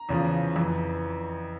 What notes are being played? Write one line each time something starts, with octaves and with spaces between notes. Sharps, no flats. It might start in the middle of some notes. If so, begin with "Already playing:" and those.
Already playing: A#5
E2 C#3 F3
F2 E3